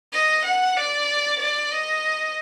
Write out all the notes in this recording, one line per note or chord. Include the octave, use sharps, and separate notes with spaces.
D#5
F#5
D5
D5
D#5